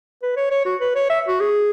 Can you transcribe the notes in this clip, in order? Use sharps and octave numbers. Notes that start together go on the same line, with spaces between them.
B4
C#5
C#5
F#4
B4
C#5
E5
F#4
G#4